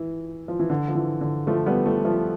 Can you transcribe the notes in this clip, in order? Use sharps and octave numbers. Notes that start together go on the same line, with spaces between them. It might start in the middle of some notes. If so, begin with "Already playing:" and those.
Already playing: E3
F3
E3
D3
F3
E3
D3
F3 A3
G3 B3
F3 A3
F3 A3